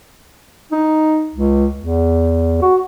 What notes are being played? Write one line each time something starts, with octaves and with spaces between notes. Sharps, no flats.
D#4
C#2
E2
F#4